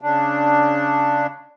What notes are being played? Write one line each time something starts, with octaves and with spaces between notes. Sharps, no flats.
C#3 D4